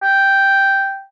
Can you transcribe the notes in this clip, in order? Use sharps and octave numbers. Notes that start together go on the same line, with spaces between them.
G5